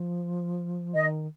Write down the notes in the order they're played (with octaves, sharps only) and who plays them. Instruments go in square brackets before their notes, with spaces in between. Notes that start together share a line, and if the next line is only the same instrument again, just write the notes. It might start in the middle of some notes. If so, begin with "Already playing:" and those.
Already playing: [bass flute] F3
[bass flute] D#3 [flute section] D#5